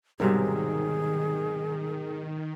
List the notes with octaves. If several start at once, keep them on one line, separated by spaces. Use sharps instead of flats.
B1 G#2 C3 D#3 G3 F#4 G#4 A#4